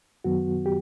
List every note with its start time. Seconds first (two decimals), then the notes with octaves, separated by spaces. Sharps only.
0.24 F#2 D#3 F#3 B3 F#4
0.66 G4